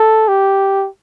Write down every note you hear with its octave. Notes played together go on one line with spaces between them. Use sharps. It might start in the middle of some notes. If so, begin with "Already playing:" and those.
Already playing: A4
G4